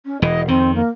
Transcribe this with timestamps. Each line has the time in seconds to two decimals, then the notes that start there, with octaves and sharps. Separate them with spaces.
0.06 C#4
0.22 E1 E3 D#5
0.48 F2 D#3 C4
0.75 A#3